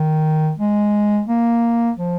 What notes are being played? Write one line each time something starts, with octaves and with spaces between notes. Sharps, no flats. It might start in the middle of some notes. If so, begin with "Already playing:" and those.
Already playing: D#3
G#3
A#3
F3